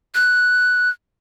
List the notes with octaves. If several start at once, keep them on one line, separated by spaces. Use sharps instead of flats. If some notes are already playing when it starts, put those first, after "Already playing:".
F#6